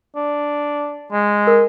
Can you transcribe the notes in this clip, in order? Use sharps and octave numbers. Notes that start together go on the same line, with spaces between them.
D4
G#3
A#4